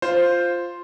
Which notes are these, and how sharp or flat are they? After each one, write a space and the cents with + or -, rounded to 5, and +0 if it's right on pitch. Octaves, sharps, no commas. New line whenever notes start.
F4 +0 C5 +0